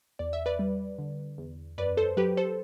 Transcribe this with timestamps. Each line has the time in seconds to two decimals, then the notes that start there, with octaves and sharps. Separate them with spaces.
0.19 E2 D5
0.33 E5
0.46 B4 D5
0.59 G3
0.99 D3
1.38 E2
1.78 F#2 B4 D5
1.97 A4 C5
2.17 F#3 G4 B4
2.37 A4 C5